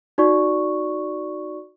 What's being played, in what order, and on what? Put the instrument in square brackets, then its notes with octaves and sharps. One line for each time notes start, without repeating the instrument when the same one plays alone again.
[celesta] D#4 F#4 D5 C#6